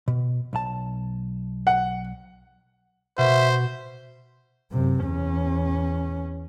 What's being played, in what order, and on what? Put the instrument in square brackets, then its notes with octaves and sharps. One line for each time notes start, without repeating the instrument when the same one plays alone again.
[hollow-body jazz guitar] B2
B1 A5
[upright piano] F#5
[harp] B2 [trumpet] C5 [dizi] E5
[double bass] F#2 C3
E2 C#4